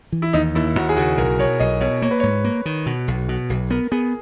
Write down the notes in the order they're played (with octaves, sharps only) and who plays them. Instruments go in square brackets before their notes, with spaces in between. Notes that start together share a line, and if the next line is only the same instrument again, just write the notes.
[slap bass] E3
[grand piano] E4
[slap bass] D#2 [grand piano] D#4
[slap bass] D#2 [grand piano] E4
[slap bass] D#2 [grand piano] F#4
[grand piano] G#4
[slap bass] C#3 [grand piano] F#4
[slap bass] B1 [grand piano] A#4
[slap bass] B2 [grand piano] C#5
[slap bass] B1 [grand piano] D#5
[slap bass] B2 [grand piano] C#5
[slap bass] A#3 [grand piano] C#5
[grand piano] B4
[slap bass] G#2 [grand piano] C#5
[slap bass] A#3
D#3
B2
B1
B2
B1
[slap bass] B3 [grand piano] A#4
[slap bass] B3 [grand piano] G#4